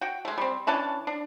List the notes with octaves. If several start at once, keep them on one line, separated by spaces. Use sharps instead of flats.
F#4 G5
G#3 A3
G3 C4
E3 C#4 D4 A5
D4